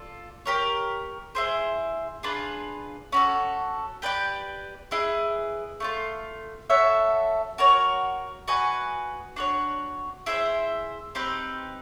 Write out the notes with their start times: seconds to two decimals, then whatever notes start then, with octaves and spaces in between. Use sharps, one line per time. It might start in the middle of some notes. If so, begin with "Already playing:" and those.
Already playing: F4 A4 D5
0.45 G4 A#4 C#5
1.35 E4 G#4 C5
2.23 D4 F4 G#4 B4
3.12 C#4 F#4 A4
4.02 G4 B4 D5 G5
4.91 E4 G#4 B4 D#5
5.80 A3 D4 F4
6.70 F#4 A4 C#5 E5
7.58 F#4 A#4 C#5
8.48 F#4 B4 D#5 G#5
9.36 D4 F#4 A4 C#5
10.26 E4 G#4 C5 E5
11.15 C4 D#4 G4 B4